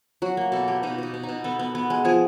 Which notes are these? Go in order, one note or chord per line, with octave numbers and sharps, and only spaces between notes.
F#3 F#4
A#3
B2 A4
A#3 G4
B2 D#4
B2 D#4
B2
D#4
B2
B3 A4
B3
B3
G#3
F3 G#4